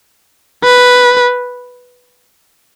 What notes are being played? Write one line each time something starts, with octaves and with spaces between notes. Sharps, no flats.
B4